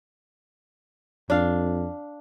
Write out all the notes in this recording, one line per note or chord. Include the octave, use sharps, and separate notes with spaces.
F2 D4 F5